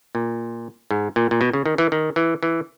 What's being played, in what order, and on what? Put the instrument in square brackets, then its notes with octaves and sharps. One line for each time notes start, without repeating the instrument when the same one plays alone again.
[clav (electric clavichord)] A#2
G#2
A#2
A#2
B2
C#3
D#3
E3
D#3
E3
E3